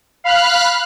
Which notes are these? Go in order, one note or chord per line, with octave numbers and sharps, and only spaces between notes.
F5 B5 F6 F#6